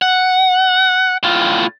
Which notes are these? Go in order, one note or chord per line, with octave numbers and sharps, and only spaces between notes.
F#5
A2 F4